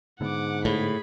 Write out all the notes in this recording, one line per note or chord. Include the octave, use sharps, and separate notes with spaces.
G#2 D3 B3 F#5 D6
A2 G#4 B5